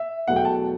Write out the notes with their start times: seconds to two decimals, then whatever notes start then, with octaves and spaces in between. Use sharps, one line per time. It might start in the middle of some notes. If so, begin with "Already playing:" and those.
Already playing: E5
0.27 E2 B2 F#3 A3 F#5
0.36 G5
0.45 A5